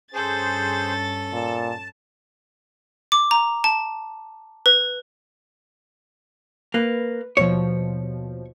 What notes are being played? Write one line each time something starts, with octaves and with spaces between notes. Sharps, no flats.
G2 C#4 G#4 A4 C5 A6
A#2 A5
D6
A#5
A5
B4
A#3 B4
D#2 B2 F3 C#5